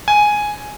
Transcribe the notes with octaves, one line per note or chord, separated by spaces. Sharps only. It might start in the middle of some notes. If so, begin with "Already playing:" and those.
G#5